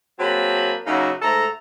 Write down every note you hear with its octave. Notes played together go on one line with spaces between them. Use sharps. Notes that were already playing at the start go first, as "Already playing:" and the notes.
F#3 A#3 C4 G#4 A5 B5
C#3 F#3 A#3 D#4 E4 F#4
G#2 A3 A4 A#5